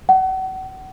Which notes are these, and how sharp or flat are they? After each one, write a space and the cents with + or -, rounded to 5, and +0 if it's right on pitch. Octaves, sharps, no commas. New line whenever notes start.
F#5 +35